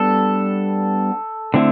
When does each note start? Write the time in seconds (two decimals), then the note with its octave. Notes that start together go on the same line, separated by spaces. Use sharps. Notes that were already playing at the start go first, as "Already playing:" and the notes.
Already playing: G3 B3 D4 A4
1.54 D3 A3 C4 E4